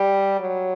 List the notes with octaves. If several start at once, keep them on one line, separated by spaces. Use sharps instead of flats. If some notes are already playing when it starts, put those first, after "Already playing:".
Already playing: G3
F#3